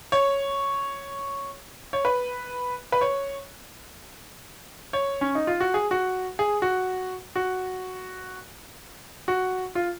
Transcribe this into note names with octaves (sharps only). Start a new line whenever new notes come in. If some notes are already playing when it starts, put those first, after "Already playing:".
C#5
C#5
B4
B4
C#5
C#5
C#4
D#4
F4
F#4
G#4
F#4
G#4
F#4
F#4
F#4
F4